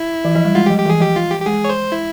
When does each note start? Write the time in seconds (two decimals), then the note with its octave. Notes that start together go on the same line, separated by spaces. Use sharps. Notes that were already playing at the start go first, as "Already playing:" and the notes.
Already playing: E4
0.25 E3
0.35 F3
0.45 G3
0.55 G#3 F4
0.66 G4
0.70 F3
0.78 G4
0.85 E3
0.89 G#4
1.01 F3 G4
1.16 F4
1.31 G4
1.41 G4
1.46 G#3 G#4
1.65 C#5
1.69 C5
1.92 E4